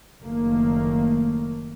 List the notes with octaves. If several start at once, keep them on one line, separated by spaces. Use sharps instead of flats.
F#1 D#3 A3 A#3